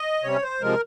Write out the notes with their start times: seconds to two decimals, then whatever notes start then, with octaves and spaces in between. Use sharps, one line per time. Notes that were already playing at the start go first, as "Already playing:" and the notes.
Already playing: D#5
0.23 C3 G3 C#4 C#5
0.42 C5
0.61 C3 F3 G#3 A#4